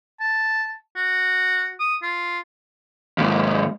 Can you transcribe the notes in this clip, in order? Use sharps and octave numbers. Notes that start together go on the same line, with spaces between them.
A5
F#4
D#6
F4
D#2 G#2